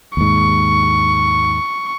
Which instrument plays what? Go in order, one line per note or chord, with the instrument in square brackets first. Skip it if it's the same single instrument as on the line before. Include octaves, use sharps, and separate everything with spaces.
[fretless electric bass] D#2 G#2 [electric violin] C#6